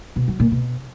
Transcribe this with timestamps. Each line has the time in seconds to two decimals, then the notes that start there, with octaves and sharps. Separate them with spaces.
0.16 B2
0.28 F#3
0.40 A#2
0.51 B2